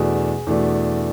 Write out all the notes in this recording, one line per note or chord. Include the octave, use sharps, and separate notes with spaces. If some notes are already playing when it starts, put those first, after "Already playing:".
Already playing: E2 B2 A3 D4 G#4
E2 B2 A3 D4